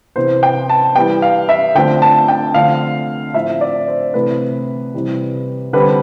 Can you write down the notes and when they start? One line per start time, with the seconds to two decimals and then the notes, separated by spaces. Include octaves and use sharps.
0.16 C3 E3 B3 C5
0.43 G5
0.69 A5
0.95 E3 G3 B3 G5
1.22 F5
1.49 E5
1.75 D3 F3 A3 C4 G5
2.02 A5
2.28 G5
2.55 D3 F3 A3 C4 F5
3.34 A2 F3 C4 E5
3.61 D5
3.88 C5
4.14 C3 E3 A3 C4 B4
4.94 C3 E3 G3
5.73 D3 G3 C4 B4